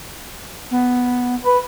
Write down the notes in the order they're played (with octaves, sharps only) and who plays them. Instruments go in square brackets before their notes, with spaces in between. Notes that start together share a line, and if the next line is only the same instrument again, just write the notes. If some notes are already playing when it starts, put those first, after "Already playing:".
[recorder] B3
[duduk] B4